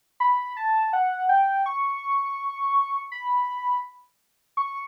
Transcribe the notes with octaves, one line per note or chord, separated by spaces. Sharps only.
B5
A5
F#5
G5
C#6
B5
C#6